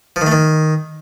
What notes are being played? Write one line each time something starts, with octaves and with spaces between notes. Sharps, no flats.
F3
D#3
A3
D#3